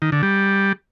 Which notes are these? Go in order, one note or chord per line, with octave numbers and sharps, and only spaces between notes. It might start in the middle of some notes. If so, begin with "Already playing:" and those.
D#3
D3
G3